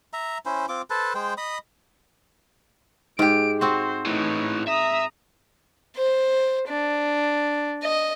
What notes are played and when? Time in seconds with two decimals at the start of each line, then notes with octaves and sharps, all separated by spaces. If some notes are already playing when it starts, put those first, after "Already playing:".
0.13 E5 A#5
0.46 C#4 E4 C5
0.69 C4 F4 D6
0.90 A4 B4 C5 A5
1.15 G#3 C5 G5
1.38 D#5 B5 D#6
3.19 G#2 G4 D7
3.61 C4 F#4 C5
4.06 A2 E3 D#4 C#5
4.68 E5 A#5 D#6
5.97 C5
6.68 D4
7.83 D#5